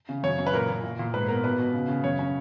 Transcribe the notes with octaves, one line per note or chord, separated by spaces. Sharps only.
C#3
F#2 C#5
F#2
B4
A#2 A#4
A#2
A#2
A#2
G#2 B4
B3 A#4
B2 B4
B2
C#3
C#3
F#2 C#5
C#4